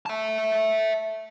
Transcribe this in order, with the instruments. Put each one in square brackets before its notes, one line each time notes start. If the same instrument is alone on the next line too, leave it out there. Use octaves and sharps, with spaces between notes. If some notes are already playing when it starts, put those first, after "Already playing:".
[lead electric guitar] E5 A5